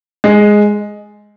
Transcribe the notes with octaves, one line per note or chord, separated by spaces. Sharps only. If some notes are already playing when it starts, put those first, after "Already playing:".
G#3